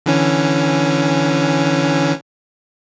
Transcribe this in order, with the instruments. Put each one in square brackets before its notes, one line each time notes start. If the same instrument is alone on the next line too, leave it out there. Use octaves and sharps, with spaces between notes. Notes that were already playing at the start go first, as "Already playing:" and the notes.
[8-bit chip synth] D3 E3 C#4